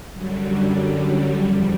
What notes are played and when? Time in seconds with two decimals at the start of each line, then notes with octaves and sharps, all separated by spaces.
0.13 F#2 D3 F#3 G3
1.43 E2 C#3 F3 G3